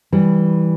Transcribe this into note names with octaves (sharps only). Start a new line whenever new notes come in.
E3 G3